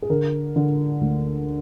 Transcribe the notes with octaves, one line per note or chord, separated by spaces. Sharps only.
G#4
D3 A#4
D3
D2